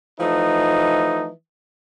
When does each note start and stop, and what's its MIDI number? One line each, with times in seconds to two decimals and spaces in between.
0.20 1.29 52
0.20 1.29 53
0.20 1.29 57
0.20 1.29 63